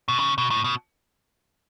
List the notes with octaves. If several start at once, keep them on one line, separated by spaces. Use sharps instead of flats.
B2
C#3
B2
A2
B2